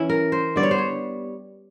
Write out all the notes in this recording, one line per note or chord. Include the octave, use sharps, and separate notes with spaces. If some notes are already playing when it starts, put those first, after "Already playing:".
Already playing: E3 C#4 E4
A#4
C5
D3 G3 B3 D5
C#5
C5
C#5